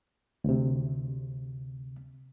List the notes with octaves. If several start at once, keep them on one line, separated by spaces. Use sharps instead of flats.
D2 C3